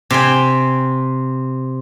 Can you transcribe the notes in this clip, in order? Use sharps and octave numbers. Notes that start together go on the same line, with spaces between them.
C3 G5 G#5